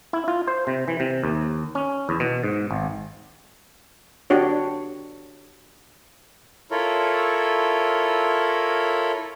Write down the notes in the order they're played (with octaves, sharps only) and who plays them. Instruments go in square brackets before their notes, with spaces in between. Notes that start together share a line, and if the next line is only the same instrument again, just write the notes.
[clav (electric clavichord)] E4
F4
C5
C3
E3
C3
D#2
C#4
E2
B2
G#2
G#1
[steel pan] D4 F#4 G4 C#5
[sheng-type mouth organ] E4 F4 A4 A#4 C#5